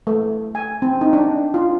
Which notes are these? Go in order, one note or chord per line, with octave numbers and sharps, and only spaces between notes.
A3
G#5
C4
D#4
D4
F4